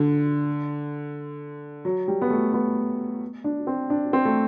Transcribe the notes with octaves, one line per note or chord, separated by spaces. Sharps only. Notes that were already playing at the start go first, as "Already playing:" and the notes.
Already playing: D3
F#3
G3
B3
A3
B3
D4
C4
D4
C4
A3